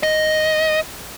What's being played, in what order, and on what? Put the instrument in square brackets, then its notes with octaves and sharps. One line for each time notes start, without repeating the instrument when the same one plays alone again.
[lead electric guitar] D#5